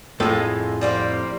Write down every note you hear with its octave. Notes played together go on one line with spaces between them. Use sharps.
F2 A2 F3 G#3 A4
G3 A#3 C4